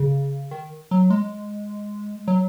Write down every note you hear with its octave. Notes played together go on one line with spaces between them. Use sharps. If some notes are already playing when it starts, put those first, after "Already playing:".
Already playing: C#3
D#3
F#3
G#3
F#3